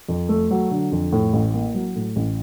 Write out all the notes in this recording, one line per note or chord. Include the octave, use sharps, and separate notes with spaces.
F2
A3
F#3
D3
F2
A2
A1
A#3
F#3
A2
A1